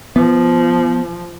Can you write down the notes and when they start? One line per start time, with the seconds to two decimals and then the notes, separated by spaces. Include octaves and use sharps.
0.16 F3 B3